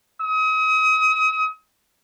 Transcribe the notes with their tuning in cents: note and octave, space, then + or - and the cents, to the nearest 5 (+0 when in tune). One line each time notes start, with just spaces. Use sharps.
D#6 +35